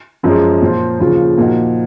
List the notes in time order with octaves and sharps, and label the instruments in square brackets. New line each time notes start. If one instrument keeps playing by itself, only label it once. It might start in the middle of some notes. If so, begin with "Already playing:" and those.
[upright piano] F#2 F3 G#3
A#2 F3 C4 F4
D#2 C#3 F3 C4 F4
A#2 F3 A#3 D#4 F#4